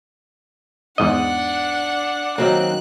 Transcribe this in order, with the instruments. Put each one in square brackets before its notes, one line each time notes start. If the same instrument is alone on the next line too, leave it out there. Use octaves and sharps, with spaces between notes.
[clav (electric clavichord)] E2 G#2 D#5 [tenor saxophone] D4 [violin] F#5
[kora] D#3 F#3 A#3 [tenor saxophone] C4 [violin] F#6